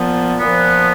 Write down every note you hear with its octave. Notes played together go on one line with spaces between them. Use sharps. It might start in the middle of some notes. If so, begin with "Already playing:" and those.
Already playing: A#2 F3 B3
A#2 F3 B3